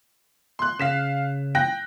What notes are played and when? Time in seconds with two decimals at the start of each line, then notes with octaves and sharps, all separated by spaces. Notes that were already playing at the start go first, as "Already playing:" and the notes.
0.59 C6 F#6
0.79 C#3 F5 B6 E7
1.55 G5 F#6 A#6